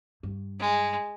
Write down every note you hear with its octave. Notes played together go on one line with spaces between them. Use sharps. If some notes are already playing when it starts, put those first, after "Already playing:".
G2
G#3